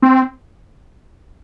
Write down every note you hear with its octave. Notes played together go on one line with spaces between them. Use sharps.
C4